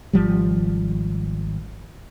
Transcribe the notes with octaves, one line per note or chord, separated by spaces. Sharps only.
G#1 F3 G3